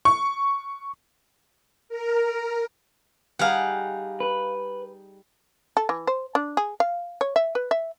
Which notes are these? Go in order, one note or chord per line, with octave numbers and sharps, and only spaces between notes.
C#6
A#4
G3 D#4 G#4 F5 F#5
B4
A4
E3
C5
D4
G#4
F5
C#5
E5
B4
E5